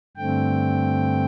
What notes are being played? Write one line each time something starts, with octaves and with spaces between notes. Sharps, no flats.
G2 D3 A3 C4 G5